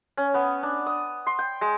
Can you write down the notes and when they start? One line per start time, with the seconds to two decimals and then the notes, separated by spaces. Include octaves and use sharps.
0.17 C#4
0.34 B3
0.63 D4
0.86 D#6
1.27 C6
1.39 G5
1.61 G#3